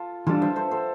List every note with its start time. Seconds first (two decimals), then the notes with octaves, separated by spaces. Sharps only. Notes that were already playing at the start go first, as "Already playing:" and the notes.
Already playing: F4 A4
0.27 E3 G3 D4 F4 A4
0.42 C5 E5
0.56 A4 C5
0.71 A4 C5